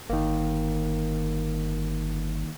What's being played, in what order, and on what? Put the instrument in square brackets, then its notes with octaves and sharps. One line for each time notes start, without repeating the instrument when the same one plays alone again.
[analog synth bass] G1 [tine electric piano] D#3 A#3